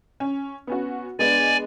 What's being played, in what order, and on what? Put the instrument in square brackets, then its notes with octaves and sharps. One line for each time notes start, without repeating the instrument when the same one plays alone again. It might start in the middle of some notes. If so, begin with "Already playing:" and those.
[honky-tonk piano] C#4
B3 C#4 F#4
[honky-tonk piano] G#3 B3 D4 [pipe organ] D5 G#5